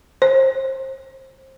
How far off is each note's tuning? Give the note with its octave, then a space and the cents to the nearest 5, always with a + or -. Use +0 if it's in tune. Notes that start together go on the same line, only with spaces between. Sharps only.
C5 +30